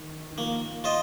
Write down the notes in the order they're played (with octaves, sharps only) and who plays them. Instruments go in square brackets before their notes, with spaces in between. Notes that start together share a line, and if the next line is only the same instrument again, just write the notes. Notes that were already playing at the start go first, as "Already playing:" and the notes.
Already playing: [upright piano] D#3
D#3
[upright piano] F3 [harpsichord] A#3
[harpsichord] F4 C5 D#5